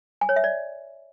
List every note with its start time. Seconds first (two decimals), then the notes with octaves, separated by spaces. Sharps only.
0.21 G#5
0.29 C#5
0.36 E5
0.44 D5